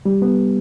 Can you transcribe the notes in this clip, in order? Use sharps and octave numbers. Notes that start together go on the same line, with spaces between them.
G3
B3